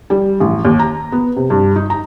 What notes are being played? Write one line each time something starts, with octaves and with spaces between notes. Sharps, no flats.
G3
A1
D#2
A#5
B3
C3
G2
D#4
A#5